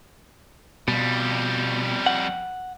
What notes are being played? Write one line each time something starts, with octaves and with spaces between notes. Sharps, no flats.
F2 B2 G3
F#5